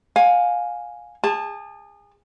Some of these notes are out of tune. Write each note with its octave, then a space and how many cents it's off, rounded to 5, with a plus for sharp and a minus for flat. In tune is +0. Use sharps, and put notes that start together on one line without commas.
F5 +25 G#5 +0
G#4 -30 A5 +0